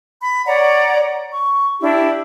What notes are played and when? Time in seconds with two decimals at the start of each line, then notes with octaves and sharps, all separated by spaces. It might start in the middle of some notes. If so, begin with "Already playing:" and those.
0.22 B5
0.47 C#5 D5 F#5 A#5
1.32 C#6
1.80 D4 E4 G4